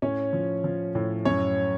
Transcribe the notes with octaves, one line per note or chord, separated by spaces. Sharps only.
A2 C#4 C#5
F3
F3
A2
F#2 C#4 C#5